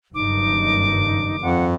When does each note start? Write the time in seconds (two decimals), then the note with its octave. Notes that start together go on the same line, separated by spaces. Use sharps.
0.15 F#1 G2 D#3 D#4 D6
1.42 F2 F#5